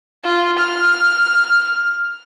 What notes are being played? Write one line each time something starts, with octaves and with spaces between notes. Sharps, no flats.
F4
F6